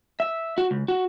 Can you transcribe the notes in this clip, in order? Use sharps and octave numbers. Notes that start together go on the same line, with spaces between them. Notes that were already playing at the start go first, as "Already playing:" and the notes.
E5
F#4
C#2
F#4